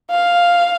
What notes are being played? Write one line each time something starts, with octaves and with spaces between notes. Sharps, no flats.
F5